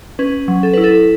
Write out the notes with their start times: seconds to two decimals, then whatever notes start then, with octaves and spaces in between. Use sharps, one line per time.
0.19 C#4 B4
0.48 F#3
0.63 A4
0.73 E4 B4
0.84 A4